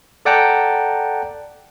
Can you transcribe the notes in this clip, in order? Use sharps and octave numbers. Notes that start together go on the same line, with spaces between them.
A4 D5 F#5 G5 A5 A#5